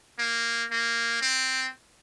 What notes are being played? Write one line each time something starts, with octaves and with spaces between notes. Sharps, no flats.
A#3
A#3
C4